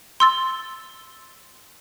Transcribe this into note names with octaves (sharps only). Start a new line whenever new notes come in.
C6 E6 A6